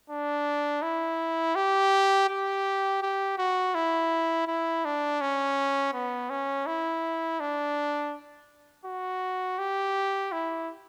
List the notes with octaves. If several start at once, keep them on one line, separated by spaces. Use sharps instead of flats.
D4
E4
G4
G4
G4
F#4
E4
E4
D4
C#4
B3
C#4
E4
D4
F#4
G4
E4